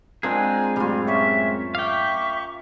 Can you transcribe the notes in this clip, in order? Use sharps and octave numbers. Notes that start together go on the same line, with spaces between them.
G#3 A#3 C4 D4 F4 G#4 G#5
F#2 A2 G3 F4
C#4 C#5 E5
E5 F5 G5 C#6 D6